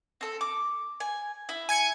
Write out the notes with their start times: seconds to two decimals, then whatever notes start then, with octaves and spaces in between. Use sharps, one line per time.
0.21 C4 A4
0.41 D6
1.00 G#5
1.49 E4
1.69 G#5 G#6 C#7